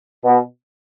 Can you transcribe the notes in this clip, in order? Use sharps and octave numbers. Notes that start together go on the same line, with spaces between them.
B2